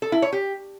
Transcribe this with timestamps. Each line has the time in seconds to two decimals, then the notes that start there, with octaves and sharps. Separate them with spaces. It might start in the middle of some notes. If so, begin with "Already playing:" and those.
0.02 A4
0.12 E4
0.22 C#5
0.33 G4